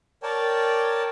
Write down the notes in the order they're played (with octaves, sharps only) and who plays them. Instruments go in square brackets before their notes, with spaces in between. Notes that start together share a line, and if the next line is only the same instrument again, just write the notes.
[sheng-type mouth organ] A#4 C#5 D5 G5 A5